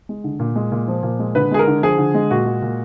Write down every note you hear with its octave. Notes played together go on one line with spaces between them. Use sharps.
G#3
D3
A#2
G#3
A#2
F3
A#2
G#3
D3 B4
G#3 G#4
A#4
D3
F3 G#4
D3
G#3
A#2 F#4
G#3
A#2